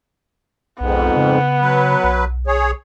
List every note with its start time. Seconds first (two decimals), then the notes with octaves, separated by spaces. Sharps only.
0.80 B1 F2 G#2 B3
1.16 C#3
1.61 F#3 B4
2.04 B1
2.47 G#4 C#5